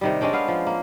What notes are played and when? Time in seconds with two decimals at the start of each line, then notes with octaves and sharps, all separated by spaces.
0.01 C3 D#3 G3
0.21 G#3 C#4 D4 G5
0.33 B3 F5
0.48 F3
0.66 A#3